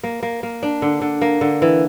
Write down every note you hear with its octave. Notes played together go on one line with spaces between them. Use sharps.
A#3
A#3
A#3
D4
D3
D3
A#3
D3
E3